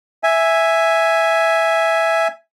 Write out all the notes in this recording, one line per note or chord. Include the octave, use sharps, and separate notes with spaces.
E5 G#5